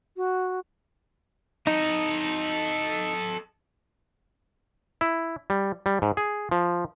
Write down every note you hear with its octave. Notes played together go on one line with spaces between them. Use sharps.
F#4
D#4 A4 D#5
E4
G3
G3
G#2
G#4
F3